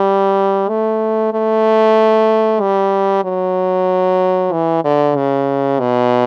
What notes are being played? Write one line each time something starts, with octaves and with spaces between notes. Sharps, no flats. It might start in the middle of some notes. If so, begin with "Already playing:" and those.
Already playing: G3
A3
A3
G3
F#3
E3
D3
C#3
B2